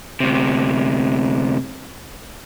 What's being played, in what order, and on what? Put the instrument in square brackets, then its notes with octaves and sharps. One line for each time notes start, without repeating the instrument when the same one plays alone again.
[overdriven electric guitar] D2 C3